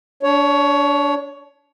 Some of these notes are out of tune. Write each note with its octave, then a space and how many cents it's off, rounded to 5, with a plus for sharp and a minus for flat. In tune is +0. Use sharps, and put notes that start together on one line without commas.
D4 -25 C#5 +15